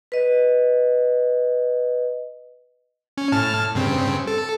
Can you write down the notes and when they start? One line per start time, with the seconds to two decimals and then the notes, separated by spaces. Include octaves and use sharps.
0.12 B4 D#5
3.18 C#4
3.32 A2 A5 F6
3.75 G2 C#3 C4
4.27 A4